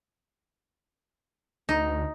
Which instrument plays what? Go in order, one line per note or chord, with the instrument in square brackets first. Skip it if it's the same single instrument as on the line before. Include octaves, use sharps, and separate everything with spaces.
[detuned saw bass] D2 [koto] D#4